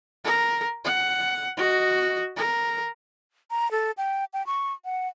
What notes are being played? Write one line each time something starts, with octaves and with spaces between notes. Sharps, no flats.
A#4
F#5
F#4 D#5
A#4
A#5
A4
G5
G5
C#6
F#5